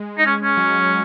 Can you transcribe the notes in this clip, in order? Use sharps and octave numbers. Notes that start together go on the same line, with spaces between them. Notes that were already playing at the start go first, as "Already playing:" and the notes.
Already playing: G#3
D#4
C#4
C#4
F#3